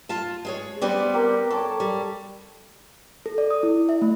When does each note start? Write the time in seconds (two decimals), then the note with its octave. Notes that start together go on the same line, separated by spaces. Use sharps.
0.09 F4 F5 A5
0.45 G#3 G#4 C#5
0.82 G3 B3 C4 D5 B5
1.14 G4 A#4
1.50 A4 C#5 A5 D6
1.80 G3
3.26 A4
3.38 D5
3.51 D#6
3.63 E4
3.89 E5
4.02 A3